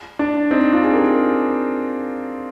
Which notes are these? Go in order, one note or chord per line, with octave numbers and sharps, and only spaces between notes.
D4
C4 D#4
D4 F4
G#4
G4 A#4